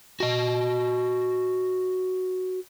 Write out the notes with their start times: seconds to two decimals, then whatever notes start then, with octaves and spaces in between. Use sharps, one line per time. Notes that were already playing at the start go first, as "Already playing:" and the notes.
0.20 F#4 D#5